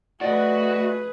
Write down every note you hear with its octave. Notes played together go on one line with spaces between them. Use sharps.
A3 F#4 G#4 B4 D5 D#5